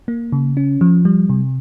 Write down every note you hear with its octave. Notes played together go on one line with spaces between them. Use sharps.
A#3
C#3
C#4
F3
G3
C3